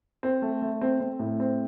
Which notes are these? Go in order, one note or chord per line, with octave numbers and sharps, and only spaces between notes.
C4
A3
A3
C4
C4
A2
C4